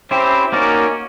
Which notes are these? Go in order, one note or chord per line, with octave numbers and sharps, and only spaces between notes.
C4 C#4 E4 G4 C5
A#3 C#4 D#4 F#4 A#4 D5